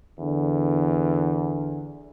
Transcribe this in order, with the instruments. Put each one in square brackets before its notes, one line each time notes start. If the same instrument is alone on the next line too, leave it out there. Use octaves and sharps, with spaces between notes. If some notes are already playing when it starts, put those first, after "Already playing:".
[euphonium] E2 [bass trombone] D3